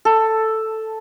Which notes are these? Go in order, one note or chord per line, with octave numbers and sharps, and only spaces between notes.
A4